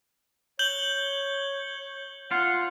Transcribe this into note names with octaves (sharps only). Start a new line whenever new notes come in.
C#5 G6 F#7 G7
F4 F#5